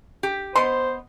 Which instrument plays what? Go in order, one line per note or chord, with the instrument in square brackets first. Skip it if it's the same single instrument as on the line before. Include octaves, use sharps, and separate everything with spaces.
[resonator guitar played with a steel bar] G4
[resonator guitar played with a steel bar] B3 D#5 [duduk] C5 [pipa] C6